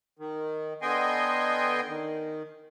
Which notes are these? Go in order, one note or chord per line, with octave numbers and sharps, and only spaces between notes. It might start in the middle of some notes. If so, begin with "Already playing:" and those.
D#3
D3 B3 D#5 G5 G#5 C6
D#3